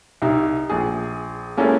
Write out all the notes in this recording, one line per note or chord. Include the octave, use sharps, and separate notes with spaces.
C2 D#4
A#1 G#4
G#3 A#3 C#4 E4 G4 A4